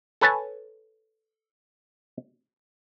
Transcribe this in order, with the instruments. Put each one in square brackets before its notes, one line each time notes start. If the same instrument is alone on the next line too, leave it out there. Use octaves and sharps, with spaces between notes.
[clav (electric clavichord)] A4 B4 C#5 G#5 A5